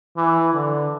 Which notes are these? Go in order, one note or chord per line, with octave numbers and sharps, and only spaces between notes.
E3
D3